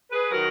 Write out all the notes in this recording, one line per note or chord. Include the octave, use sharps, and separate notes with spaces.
G#4 B4
D#3 F#3 F#4 A#4